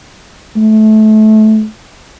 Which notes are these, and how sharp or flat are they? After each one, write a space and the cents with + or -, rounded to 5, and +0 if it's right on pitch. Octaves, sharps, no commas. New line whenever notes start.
A3 -25